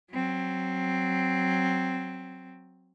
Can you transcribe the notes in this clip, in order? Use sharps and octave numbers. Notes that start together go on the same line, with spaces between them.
F#3 C4